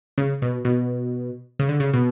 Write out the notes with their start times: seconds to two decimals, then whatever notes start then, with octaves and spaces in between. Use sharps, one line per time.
0.18 C#3
0.42 B2
0.65 B2
1.59 C#3
1.69 D3
1.80 C#3
1.93 B2